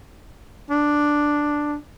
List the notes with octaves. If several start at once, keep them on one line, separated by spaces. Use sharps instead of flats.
D4